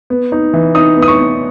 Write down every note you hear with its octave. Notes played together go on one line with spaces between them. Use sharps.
B3
D#4
E3
D#4 D#6
B3
D#6
C#6
B3